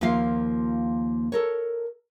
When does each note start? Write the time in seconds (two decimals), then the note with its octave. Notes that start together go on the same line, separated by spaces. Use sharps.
0.01 D#2 F3 A#3 F4 F5
1.32 A4 A#4 C#5